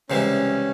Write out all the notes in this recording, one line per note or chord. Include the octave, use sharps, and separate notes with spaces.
C#2 C3 E3 G3 C#4